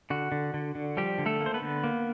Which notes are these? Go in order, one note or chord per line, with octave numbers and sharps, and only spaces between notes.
D3 F#4
D3
D3
D3
F3 G3 G4
D3
A3 A4
A#3
C5
B3 B4
D3
A#3